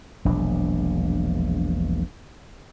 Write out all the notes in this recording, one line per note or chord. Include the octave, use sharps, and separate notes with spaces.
E1 A#1 F#3 D4